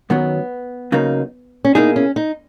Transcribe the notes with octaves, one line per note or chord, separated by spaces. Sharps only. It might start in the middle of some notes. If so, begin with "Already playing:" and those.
F#2 D#3 F#3 B3
C#3 F#3 A#3 D#4
C#4
B2 A#3 D#4 E4 G#4
C#4
D#4